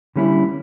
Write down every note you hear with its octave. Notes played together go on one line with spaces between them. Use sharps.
D3 G3 A#3 C#4 E4